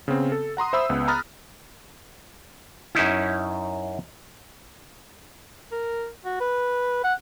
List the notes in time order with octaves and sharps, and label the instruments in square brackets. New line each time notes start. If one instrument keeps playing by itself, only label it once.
[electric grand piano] C#3 B3 C4
A4
F#5 A#5 C6 D#6
C5 E5 B5 E6
C#2 B3
A#5 B5 D#6 F6 F#6 A6
[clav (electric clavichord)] F#2 C#4 D#4 E4
[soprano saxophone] A#4
F#4
B4
F#5